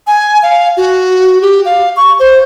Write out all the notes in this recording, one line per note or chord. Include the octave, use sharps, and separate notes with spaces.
G#5
F5
F#4
G4
F5
C#6
C5